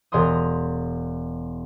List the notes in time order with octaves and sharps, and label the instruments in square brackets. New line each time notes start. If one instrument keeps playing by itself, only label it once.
[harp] E1 A#5 C6 D#6